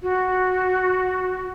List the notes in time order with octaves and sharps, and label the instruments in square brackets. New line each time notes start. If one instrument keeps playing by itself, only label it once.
[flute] F#4